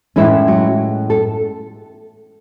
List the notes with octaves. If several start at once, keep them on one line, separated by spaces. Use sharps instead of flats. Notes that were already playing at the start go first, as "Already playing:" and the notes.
A2 E3 G#3 C#4 E4
F#3 F#4
A4